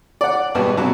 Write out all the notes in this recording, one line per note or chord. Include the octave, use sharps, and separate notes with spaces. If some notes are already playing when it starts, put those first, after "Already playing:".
D5 F#5
G#1 B2 G3 B3
F2 B2 F#3